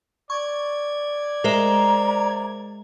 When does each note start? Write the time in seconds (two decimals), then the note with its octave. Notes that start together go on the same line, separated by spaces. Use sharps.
0.30 D5 C#6 G#6
1.44 G#3 A#4 C5 E5 A#5